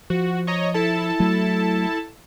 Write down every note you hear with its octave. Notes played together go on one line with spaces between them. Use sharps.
F3 F#4
C#5 D#5 A#5
E4 A4 A5
F#3 A3